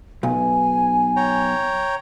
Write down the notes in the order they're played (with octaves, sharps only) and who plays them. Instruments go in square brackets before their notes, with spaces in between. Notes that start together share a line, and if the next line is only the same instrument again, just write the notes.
[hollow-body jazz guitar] B1 [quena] G#5
[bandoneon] C#5 G5 A#5